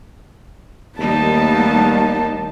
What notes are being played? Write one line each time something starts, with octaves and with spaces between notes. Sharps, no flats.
D#2 G3 A3 B3 D#4 A5